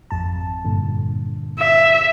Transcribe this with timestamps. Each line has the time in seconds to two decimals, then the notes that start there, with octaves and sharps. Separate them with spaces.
0.11 G#1 F2 A5
0.65 G2 A#2 D3
1.59 E5